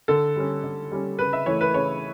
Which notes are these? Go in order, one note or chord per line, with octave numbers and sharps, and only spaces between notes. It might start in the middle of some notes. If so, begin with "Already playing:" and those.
D3 A4
G3 C#4
D3
G3 C#4
C#3 B4
E5
E3 A3 C#5
B4
C#3 C#5